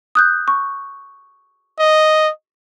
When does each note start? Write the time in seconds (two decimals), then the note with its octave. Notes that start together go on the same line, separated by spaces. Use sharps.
0.15 D#6 F#6 G6
0.48 C#6
1.79 D#5